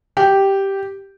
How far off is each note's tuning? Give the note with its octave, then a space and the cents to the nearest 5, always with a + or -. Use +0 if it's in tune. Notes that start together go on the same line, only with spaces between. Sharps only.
G4 -5